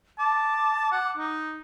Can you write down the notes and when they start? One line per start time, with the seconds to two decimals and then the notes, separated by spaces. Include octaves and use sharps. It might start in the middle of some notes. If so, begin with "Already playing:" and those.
0.19 A5 D6
0.92 F#5
1.17 D#4